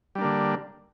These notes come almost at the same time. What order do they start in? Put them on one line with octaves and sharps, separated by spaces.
G3 D4 A#3 D3